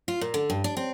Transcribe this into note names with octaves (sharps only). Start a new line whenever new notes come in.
F4
A#2
D3
G2
D4
C4